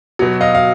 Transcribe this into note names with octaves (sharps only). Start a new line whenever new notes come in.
B2 F#3
D#5 F5
F5